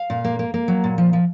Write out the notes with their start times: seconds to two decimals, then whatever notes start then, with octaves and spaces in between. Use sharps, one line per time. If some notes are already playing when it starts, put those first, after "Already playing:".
Already playing: F5
0.10 A#2
0.24 A#3
0.39 A#3
0.54 A#3
0.68 F#3
0.84 A#2
0.98 F3
1.13 F3